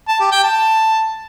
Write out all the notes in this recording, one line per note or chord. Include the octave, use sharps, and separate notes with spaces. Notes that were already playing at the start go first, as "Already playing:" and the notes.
A5
G4
G5
A5